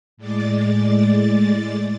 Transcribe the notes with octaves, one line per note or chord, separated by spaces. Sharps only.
A2 G#3 D5 A6